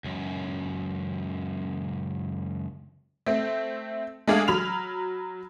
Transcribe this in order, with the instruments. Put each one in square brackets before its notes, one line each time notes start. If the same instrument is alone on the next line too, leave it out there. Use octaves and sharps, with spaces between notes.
[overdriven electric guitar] C#2 F#2
[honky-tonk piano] A3 C4
G#3 A3 D4 G#4 A4 F5
F#3 B5 F6 F7